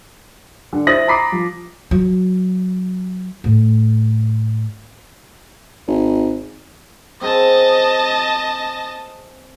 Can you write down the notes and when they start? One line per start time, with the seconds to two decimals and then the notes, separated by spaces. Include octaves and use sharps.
0.73 D3
0.87 E4 C5 D#6 A6 A#6 F#7
1.08 A#5 B5 D6 D#6 B6 C7
1.32 F3
1.91 F#3
3.44 A2
5.88 G#1
7.21 C4 G#4 A#4 D#5 A5